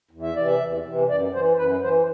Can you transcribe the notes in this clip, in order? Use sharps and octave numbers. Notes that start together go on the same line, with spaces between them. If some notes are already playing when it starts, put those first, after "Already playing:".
E2
E5
C3 E3 D5
E5
E2
C3 E3
F#2 D5
E3 C5
F#2 B4
E3 C5